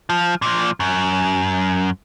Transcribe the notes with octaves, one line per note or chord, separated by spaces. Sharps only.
F3
A#2 F3
F#2